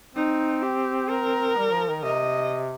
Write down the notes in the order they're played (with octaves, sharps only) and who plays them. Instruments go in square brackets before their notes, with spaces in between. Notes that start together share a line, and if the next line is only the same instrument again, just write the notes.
[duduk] C4 [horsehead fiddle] D#4
[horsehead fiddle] G4
A#4
[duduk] G3
F3
D#3
[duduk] C3 [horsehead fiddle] D#5